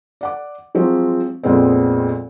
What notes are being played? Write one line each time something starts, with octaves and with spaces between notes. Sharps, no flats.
D5 F#5 D6
F3 F#3 G#3 C4
F2 A#2 G#3 B3 C4